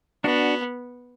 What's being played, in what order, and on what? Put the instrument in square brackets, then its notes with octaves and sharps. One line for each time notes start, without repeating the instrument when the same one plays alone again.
[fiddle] B3 [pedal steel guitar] D4 F#4